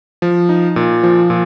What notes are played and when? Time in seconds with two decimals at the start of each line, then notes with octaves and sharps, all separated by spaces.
0.22 F3
0.49 D#4
0.76 A#2
1.03 F3
1.30 A#2